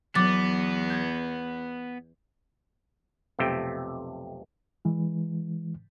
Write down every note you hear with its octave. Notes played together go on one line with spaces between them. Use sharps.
E2 F#3 B3 D6 A6
G6 G#6
B1 F2 C3 A3 G5
E3 G#3